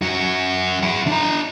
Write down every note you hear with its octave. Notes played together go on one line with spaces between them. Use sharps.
F#2 F#4
E4 F#5
D4 A#5